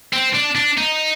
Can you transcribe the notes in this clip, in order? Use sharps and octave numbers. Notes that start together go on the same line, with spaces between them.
C4
D4
D4
D#4